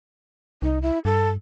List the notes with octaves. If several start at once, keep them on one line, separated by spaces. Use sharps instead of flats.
C2 D#4
E4
G2 A4